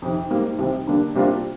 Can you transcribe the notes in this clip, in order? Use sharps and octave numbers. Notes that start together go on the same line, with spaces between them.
F2 C3 D#3
G#2 G3 A#3
C2 C3 D#3
D3 G3 A#3 D4
C3 G3 A#3 D4 F4